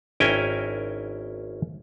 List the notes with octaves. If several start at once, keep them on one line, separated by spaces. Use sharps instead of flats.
G#1 C#4 E4 A#4 G5 G#5